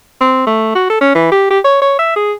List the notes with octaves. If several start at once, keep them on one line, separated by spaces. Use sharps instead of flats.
C4
A3
F#4
A4
C#4
E3
G4
G4
C#5
C#5
E5
G#4